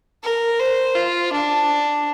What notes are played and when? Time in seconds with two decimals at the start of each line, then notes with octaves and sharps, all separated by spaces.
0.24 A#4
0.59 C5
0.95 F4
1.32 D4